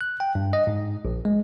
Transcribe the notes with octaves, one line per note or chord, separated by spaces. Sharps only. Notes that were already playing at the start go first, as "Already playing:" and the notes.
F#6
G5
G2
D#5
G#2
A#1
G#3